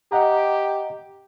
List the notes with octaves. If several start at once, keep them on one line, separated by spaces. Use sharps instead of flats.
G4 D#5 F#5 A#5